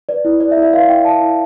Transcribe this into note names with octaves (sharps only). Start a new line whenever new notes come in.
B4 D5
E4
D5
E5
E4
E5
B4 F5
E4 G5
D5 A5
E4